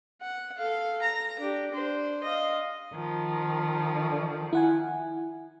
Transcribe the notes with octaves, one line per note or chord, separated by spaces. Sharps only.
F#5
A4 F5
A#5
D4 G4
D4 C5
D#5 F5
D#3 F3
E4 F#5 G#5